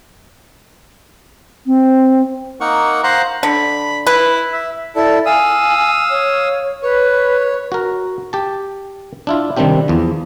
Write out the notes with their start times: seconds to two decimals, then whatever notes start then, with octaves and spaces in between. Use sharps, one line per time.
1.66 C4
2.61 A#3 D#4 A#4 F#5 C#6
3.04 C5 F5 F#5 A#5 C6 F#6
3.43 D3 B5
4.07 E4 B4
4.53 E5
4.96 E4 A4 D5
5.26 F5 G#5 D#6 E6
6.10 C#5
6.83 B4 C#5
7.72 F#4 A#4
8.33 G4 A5
9.27 D4 E4 F4
9.56 C3 D#3 G3 C4 D4 G4
9.88 E2 F3